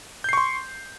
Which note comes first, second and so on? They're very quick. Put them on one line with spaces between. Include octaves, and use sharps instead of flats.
G6 C7 C#6 C6